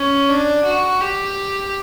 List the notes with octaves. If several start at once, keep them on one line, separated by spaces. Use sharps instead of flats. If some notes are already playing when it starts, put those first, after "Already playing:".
Already playing: C#4
D4
F#4
G4